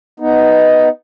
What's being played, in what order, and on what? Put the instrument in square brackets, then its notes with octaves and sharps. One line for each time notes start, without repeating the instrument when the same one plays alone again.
[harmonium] B3 D#4